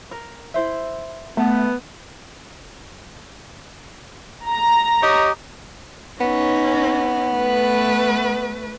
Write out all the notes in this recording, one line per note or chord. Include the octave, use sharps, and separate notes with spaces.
A#4
E4 C5 E5
A3 B3 A5
A#5
G4 C#5 D#5
B3 C#4 D#4
A3 B4